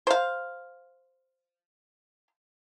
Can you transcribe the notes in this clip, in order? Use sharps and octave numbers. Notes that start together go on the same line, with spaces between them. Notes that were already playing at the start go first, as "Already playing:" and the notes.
C5 F5